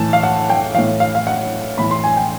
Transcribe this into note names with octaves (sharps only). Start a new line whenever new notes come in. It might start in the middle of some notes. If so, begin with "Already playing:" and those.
Already playing: A2 E3 A5
F5
F#5
G5
A2 E3 F5
F5
F5
F#5
A2 E3 B5
C6
G#5
G5